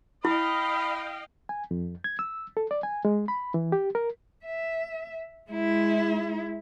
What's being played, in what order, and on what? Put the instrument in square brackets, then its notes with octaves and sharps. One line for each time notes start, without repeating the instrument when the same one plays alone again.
[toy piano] E4 [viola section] D#5 F5 G5 [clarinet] B5
[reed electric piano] G#5
F2
G#6
E6
A4
D5
G#5
G#3
B5
E3
G4
A#4
[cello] E5
G#3 E4